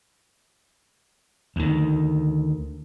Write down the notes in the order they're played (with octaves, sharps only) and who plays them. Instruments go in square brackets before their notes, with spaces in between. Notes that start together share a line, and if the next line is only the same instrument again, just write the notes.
[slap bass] D2 D#3